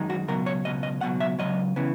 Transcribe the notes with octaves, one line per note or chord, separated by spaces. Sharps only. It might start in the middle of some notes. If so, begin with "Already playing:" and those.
Already playing: F#2 D#3 G#3 D#4
F#4
C#2 B2 F#3 A#4
C#5
C#2 B2 F#3 D#5
D#5
C#2 B2 F#3 F#5
E5
C#2 B2 F#3 D#5
C#3 E3 B3